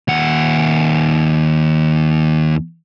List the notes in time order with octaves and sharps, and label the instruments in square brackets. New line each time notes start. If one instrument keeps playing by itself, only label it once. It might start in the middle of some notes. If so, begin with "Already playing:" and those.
[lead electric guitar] D#2 F#5